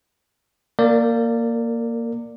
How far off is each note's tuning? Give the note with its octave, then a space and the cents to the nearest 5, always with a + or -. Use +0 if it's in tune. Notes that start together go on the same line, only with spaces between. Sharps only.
A#3 +0 A#4 -30 D5 +0